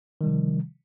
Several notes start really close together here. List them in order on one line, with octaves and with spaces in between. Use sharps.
D#3 G3 C3 F3